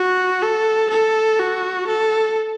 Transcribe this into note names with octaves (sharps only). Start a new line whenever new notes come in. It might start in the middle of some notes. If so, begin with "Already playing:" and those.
Already playing: F#4
A4
A4
F#4
A4